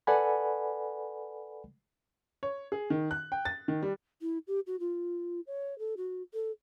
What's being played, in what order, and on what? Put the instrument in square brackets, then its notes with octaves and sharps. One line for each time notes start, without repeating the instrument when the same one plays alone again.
[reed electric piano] A4 B4 D5 F#5 G#5 B5
[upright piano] C#5
G#4
D#3
F#6
G5
A6
D#3
G3
[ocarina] E4
G4
F#4
F4
C#5
A4
F#4
A4